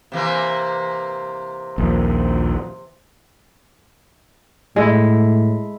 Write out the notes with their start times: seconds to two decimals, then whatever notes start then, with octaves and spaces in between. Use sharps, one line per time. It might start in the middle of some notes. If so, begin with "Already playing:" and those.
0.12 C3 E3 A#3
1.78 A#1 D#2
4.76 A2 G#3 E4 A4